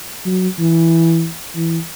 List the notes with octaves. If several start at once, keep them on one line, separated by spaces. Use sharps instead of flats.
F#3
E3
E3